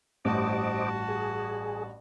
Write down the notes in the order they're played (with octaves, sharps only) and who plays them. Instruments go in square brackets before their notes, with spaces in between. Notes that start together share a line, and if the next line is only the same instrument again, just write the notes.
[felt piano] A1 G2 [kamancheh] F#4 A5 [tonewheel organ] C5 D#5 D6
[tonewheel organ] G#4